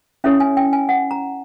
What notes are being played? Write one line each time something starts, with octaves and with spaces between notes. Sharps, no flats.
C#4 E4 A4 C#5 E5
G#5
G5
G#5
F#5
A#5